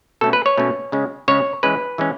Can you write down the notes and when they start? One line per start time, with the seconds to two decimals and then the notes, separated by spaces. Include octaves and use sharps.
0.21 B2 A3 C#4 A4
0.33 B4
0.46 C#5
0.58 B2 A3 C#4
0.92 C#3 G#3 C#4
1.28 C#3 G#3 C#4 C#5
1.63 E3 G#3 C#4 B4
1.98 E3 G#3 C#4